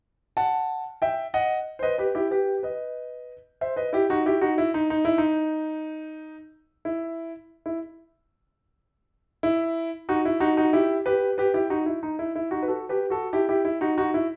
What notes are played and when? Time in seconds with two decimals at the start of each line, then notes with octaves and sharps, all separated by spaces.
0.37 F#5 A5
1.02 E5 G5
1.34 D#5 F#5
1.79 C5
1.83 B4 D#5
1.98 G4 B4
2.15 E4 G4
2.31 G4 B4
2.63 B4 D#5
3.61 C5 E5
3.76 B4 D#5
3.93 E4 G4
4.10 D#4 F#4
4.26 E4 G4
4.41 D#4 F#4
4.58 E4
4.74 D#4
4.90 D#4
5.05 E4
5.18 D#4
6.85 E4
7.66 E4
9.43 E4
10.09 D#4 F#4
10.25 E4
10.40 D#4 F#4
10.57 D#4 F#4
10.73 E4 G4
11.06 G4 B4
11.38 G4 B4
11.54 E4 G4
11.70 D#4 F#4
11.86 E4
12.03 D#4
12.19 E4
12.36 E4
12.51 D#4 F#4
12.63 B4
12.68 F#4 A4
12.89 G4 B4
13.10 F#4 A4
13.33 E4 G4
13.49 E4 G4
13.65 E4
13.81 D#4 F#4
13.98 D#4 F#4
14.14 E4